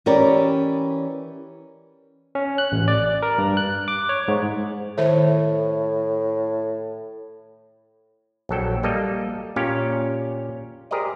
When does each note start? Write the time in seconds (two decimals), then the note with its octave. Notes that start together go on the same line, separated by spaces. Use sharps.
0.06 E3 C#4 G4 A#4 D5
2.35 C#4
2.58 F#6
2.72 A1
2.88 D5
3.22 A#4
3.38 G2
3.57 F#6
3.88 D6
4.09 C#5
4.28 G#2
4.98 A2 D#3 C5 E5
8.49 A#1 F#3 A4 G5
8.83 G3 A#3 A4 D#5
9.56 A#2 C#4 G4 C#5 F5
10.91 G4 G#4 A#4 C5 D5 D#5